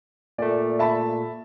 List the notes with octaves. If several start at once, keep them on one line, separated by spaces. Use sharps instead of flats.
A#2 A3 D5
E5 A5 B5